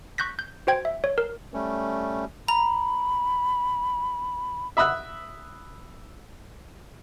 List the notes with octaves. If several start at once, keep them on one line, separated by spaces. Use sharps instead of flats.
C#6 F#6 G6 A#6 B6
G6
F#4 C5 G5 G#6
E5
C#5
A#4
G3 A3 C#4
A#5 B5
E5 B5 D#6 E6 F#6